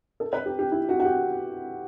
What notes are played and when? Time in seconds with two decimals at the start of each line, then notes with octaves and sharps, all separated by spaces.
0.20 A4
0.33 B4
0.46 G4
0.59 G4
0.72 E4
0.89 F#4
1.00 F#4
1.05 G4